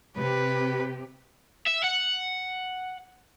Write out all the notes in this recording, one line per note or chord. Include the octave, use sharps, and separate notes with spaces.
C3 G4 B4
E5
F#5